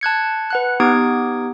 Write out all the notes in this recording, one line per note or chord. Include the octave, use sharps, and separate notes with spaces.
A5 F#6 G#6 C#7
B4 F#5 F#6
B3 D#4 G4 D#6 G#6 D7